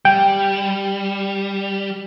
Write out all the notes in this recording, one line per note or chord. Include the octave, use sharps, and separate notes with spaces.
G3 G5